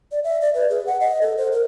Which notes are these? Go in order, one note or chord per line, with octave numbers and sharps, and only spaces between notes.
D5
E5
D5
B4
G#4
F#5
D#5
A4
C5
A#4